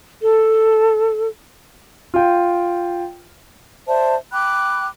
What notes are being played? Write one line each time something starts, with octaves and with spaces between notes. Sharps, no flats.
A4
F4 G5
C5 D5 E5 A5
G5 B5 D6 F#6